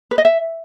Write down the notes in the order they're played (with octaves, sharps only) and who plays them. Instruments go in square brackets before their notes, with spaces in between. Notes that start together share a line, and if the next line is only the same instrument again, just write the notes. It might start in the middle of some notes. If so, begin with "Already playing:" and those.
[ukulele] B4
D#5
E5